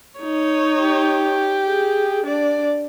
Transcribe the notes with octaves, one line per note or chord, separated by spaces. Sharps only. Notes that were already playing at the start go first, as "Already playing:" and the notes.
D#4 C#5
G4
G#4
D4 D5